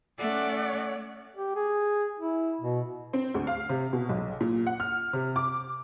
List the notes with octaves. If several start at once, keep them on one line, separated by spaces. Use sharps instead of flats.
A3 C#4 D5 F#5
G4
G#4
E4
B2
C4
D2
F5
C3
B2
B1
A#2
F#5
F6
C3
D6